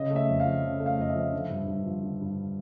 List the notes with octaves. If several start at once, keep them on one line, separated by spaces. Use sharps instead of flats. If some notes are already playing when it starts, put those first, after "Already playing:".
Already playing: C#3 D#5
A3
E5
F2
F5
F3
C#3
A3
F5
F2 D#5
E5
F3
D3
G2
G2
F3
D3
G2